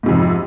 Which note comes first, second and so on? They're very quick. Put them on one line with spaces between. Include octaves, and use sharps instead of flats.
G#2 C3 F2